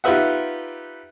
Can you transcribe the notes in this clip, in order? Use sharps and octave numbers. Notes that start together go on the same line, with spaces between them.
D#4 F4 G4 B4 E5 F#5